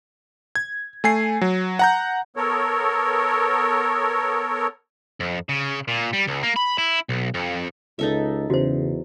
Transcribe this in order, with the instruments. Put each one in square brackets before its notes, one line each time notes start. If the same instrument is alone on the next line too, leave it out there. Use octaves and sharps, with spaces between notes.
[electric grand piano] G#6
A3 G#5 C7
F#3
F#5 A#5 G6
[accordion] B3 A4 A#4 C#5
[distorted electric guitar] F2
C#3
A#2
G3
C#2
A#3
B5
E4
B1
F2
[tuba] C#2 [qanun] D#4 A4 E5
[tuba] E2 [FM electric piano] C#3 [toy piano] F#4 C5